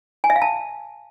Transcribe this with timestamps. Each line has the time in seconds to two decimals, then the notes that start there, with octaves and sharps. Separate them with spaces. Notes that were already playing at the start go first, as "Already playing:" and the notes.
0.24 G#5
0.30 E5
0.36 F5
0.42 A5